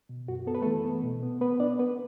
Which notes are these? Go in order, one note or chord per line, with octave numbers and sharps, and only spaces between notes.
B2
F#2 F#4
B3 A4
B4
E3 A3 A4
B3
B2
B3
B3 B4
B3 D4 D5
B3 B4